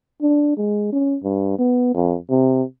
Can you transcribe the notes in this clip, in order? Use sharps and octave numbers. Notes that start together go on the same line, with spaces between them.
D4
G#3
C#4
G2
B3
F2
C3